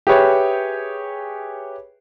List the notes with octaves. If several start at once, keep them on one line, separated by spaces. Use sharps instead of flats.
G4 G#4 B4 C#5 E5